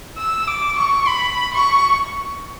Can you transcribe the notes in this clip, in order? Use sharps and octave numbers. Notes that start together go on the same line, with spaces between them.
E6
D6
C#6
B5
C#6